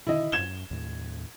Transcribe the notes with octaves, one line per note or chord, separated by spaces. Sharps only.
B2 D3 D#3 E4 D#5
F#2 G#6 E7 G7
D#2 A2